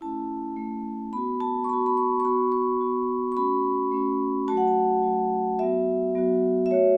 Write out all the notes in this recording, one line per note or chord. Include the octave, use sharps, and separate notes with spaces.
A3 C#4 E4 A5
A3 C#4 E4
B3 F#4 B5
A5
C#6
B3 F#4 B5
B5
C#6
C#6
B3 F#4 B5
C#6
B3 F#4
C#6
A3 C#4 F#4 B5
A3 C#4 F#4
F#3 A3 F#4 A5
F#5
A5
F#3 A3 F#4
F#3 B3 F#4 E5
F#3 B3 F#4
E5
A3 F#4 C#5